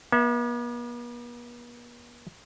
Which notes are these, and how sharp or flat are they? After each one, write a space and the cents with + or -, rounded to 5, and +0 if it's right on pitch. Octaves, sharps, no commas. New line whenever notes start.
B3 -45 E5 +0